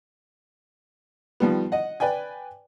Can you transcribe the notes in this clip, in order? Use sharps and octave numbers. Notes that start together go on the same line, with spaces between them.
D#3 F3 G3 B3
D#5 F#5
B4 D5 G5 G#5